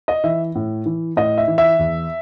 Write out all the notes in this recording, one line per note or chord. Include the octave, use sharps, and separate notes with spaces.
D#5
E3 E5
A2
E3
A2 D#5
E5
E3
E5
E2